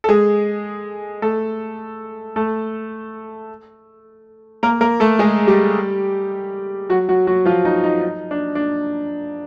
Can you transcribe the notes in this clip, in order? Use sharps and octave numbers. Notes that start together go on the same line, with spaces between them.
A4
G#3 G#4
A3 A4
A3 A4
A#3 A#4
A#3 A#4
A3 A4
G#3 G#4
G3 G4
F#3 F#4
F#3 F#4
F#3 F#4
F3 F4
D#4
D#4
D#4
D4
D4